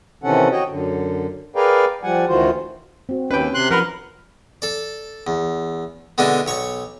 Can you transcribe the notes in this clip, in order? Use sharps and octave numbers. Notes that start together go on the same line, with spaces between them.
C3 D#3 E3 C#4 A4 F#5
F#4 C#5 D#5 G5
F#2 D3
G#4 A#4 B4 D5 F5 G5
F3 G3 F#5 G#5
D2 D#3 E3 F4 F#4 C5
C4 F#4
D#2 C#4 B4 G5
C3 C6 F#6
F3 A#4 B4 F#5 B5
A4 D5
E2
B2 D3 G#3 B3 D4 E4
B1 C#5 C#6